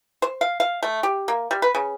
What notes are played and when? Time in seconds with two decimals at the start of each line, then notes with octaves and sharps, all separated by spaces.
0.22 C5
0.41 F5
0.60 F5
0.83 A3
1.03 G4
1.28 A#3
1.51 G3
1.62 B4
1.75 C#3